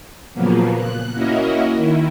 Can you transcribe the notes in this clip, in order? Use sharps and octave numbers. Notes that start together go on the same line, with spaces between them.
A#2 C#3 F3 F#3 A#3 B3
F#6
A#3 C#4 E4 F#4 A#4 D#5
D#3 E4